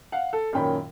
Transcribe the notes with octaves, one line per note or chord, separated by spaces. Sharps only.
F5 F#5
A4
F#2 A#2 D#3 C#4 G5 B5